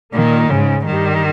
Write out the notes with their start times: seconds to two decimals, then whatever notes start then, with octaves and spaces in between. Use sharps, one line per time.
0.14 A#2 D#3 A#3
0.50 G#2 C#3 G#3
0.86 G2 D#3 G3